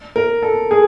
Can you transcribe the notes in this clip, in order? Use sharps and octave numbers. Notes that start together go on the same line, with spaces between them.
A#4
A4
G#4